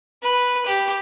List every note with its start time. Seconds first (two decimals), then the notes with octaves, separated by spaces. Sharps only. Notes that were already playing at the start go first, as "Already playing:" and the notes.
0.23 B4
0.66 G4